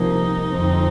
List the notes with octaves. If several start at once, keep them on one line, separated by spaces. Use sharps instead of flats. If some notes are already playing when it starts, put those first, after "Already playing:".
Already playing: C2 C3 F3 A#3 D#4
F2 D3 F3 C4